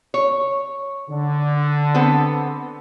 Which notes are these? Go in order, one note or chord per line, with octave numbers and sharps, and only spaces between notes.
C#5
D3
B3 C4 A4